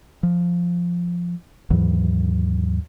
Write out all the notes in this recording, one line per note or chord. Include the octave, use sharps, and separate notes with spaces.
F3
D#2 G#2 E3 F#3